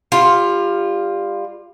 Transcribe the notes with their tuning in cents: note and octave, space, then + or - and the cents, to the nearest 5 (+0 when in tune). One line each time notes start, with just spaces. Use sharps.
G3 +25 F4 +0